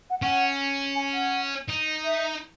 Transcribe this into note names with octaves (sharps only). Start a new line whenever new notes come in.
F#5
C#4 F#5
G#5
F#5
D#4
E5